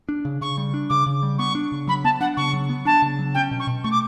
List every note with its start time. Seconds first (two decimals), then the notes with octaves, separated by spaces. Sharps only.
0.09 D4
0.25 C#3
0.41 C#3 C#6
0.57 G3
0.74 D4
0.89 C#3 D6
1.06 C#3
1.23 G3
1.38 B3 C#6
1.55 D4
1.72 C#3
1.87 F#3 B5
2.04 B3 A5
2.20 D4 F#5
2.37 C#3 C#6
2.53 F#3
2.69 B3
2.85 D4 A5
3.02 C#3
3.19 F#3
3.34 C#4 G5
3.51 B2
3.60 C#6
3.67 B2
3.84 A3 C#6
3.91 D6